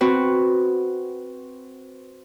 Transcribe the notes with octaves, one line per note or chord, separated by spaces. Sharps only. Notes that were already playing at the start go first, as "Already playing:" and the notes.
C4 F#4 B4